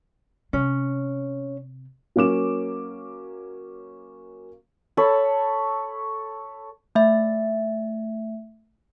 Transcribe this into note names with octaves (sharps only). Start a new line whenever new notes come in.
C3 C#4
F#3 A#3 C#4 D6 E7
A4 C#5 A5 B5
A3 E5